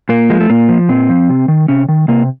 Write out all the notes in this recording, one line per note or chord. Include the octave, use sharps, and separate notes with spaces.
A#2 A#3
F3 G#3
A3
A#2 A#3
F3
A#2 C4
F3
C3
D#3
C3 C#4
D#3
C3 A#3